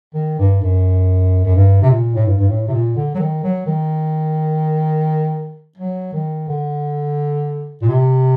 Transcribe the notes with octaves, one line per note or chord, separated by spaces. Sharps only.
D#3
G2
F#2
F#2
G2
C3
A#2
A2
G2
G2
A2
C3
A#2
D3
F#3
D#3
F#3
D#3
F#3
D#3
D3
A#2
C3